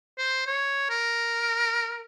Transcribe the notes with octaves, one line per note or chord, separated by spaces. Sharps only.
C5
C#5
A#4